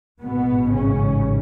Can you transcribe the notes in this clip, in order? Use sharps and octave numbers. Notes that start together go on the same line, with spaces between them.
A1 G#2 B2 B3
C#3 C#4